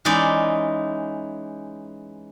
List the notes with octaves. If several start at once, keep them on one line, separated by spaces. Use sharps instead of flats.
E3 G#3 C#4 D#4 D5